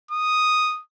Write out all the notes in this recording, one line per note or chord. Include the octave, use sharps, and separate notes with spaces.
D#6